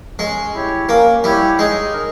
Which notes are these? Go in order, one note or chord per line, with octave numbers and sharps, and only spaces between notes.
G#3 C#4
E4 G4 C#5
A#3 C#4
G3 E4 G4 C#5
G#3 D#4
A#4